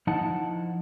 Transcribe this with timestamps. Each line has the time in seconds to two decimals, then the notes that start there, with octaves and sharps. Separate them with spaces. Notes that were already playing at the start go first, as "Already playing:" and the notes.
0.07 F3 D#4 E4 F#5 A5